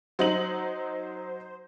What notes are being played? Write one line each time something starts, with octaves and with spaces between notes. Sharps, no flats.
F#3 D#4 C5 F#7